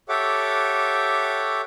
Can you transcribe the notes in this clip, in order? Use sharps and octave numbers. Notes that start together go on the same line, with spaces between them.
G4 A4 C#5 E5 F#5 D6